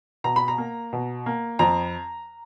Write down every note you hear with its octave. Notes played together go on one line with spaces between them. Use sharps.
B2 A#5
B5
A#5
A#3
B2
A#3
F2 A#5